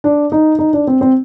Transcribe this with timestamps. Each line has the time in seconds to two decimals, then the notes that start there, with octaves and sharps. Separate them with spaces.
0.04 D4
0.32 D#4
0.59 D#4
0.73 D4
0.87 C4
1.01 C4